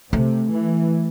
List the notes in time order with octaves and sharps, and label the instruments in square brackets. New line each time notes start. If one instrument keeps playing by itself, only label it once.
[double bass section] C3 [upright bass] A3
[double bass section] E3